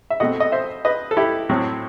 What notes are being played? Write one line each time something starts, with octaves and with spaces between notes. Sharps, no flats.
E5
B2 A3 C4 D#5 F#5
D#5
C5 E5
B4 D#5
A4
E4 G4
A2 F#3 C4